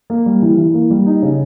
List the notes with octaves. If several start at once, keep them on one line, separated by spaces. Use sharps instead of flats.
A#3
G3
E3
E3
A#3
G3
D#4
C#3